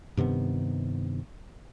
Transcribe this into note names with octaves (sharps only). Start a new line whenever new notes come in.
G2 C3 D#3 B3